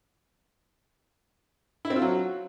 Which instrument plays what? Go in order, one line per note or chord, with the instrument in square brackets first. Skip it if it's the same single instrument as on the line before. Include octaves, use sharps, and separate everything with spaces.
[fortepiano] E4
C4
F4
F#3